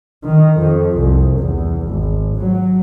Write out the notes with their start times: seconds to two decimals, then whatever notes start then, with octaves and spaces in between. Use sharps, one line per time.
0.25 D#3
0.58 F2
0.96 C2
1.39 E2
1.87 G#1
2.36 F#3